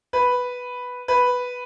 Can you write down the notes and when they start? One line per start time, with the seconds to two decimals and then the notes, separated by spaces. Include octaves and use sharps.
0.13 B4
1.08 B4